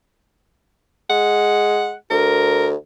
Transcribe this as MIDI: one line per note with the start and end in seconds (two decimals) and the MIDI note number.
1.10 1.94 56
1.10 1.93 78
2.10 2.75 38
2.10 2.66 70